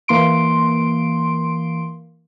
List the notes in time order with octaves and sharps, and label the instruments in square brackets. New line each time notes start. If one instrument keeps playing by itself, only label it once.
[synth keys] E3 A#3 C6 D7